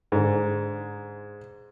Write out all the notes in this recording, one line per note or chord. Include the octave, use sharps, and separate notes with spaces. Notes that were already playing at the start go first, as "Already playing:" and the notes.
G#2 D3